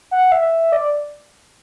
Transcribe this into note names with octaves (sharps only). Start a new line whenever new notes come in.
F#5
E5
D5